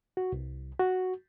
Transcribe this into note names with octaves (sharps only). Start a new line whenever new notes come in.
F#4
C2
F#4